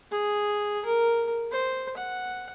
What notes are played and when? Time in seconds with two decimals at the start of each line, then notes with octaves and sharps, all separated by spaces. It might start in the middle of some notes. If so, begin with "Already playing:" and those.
0.11 G#4
0.85 A#4
1.52 C5
1.97 F#5